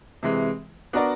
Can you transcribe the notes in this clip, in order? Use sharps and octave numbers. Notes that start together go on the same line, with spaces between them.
C3 E3 G#3
B3 D4 F#4 A#4 D5